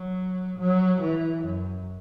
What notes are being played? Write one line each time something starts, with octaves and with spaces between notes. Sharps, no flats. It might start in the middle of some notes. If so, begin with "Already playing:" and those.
Already playing: F#3
F#3
E3
F#2